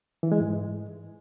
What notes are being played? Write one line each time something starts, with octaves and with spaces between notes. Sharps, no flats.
E3
G#3
G#2